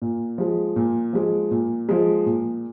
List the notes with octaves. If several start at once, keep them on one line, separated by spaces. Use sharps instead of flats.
A#2
F3 G#3
A#2
F3 G#3
A#2
F3 G#3
A#2